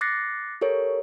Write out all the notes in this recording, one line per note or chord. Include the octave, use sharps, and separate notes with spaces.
D6 F#6 A6 A#6 C7 C#7
G4 A4 A#4 C#5